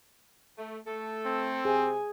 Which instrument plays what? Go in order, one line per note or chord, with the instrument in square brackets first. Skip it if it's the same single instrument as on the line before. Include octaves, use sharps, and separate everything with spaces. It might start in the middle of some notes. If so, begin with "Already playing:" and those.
[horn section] A3
A3 A4
[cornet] C4
[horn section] C3 [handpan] G#4 [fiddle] G#5